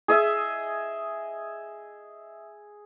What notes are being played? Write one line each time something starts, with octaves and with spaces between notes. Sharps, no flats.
G#4 D#5 E5